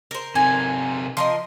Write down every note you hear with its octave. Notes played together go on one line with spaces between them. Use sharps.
A#4 C5
C3 D#4 G#5
F3 A#4 D#5 C6